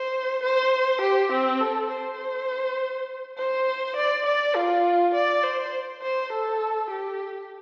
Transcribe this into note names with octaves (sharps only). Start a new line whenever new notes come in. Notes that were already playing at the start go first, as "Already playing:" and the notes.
Already playing: C5
C5
G4
C4
A4
C5
C5
D5
D5
F4
D5
C5
C5
A4
G4